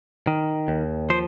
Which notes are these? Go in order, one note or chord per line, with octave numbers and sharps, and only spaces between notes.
D#3
D#2
F3 C5